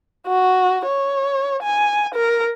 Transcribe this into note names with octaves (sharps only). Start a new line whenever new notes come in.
F#4
C#5
G#5
A#4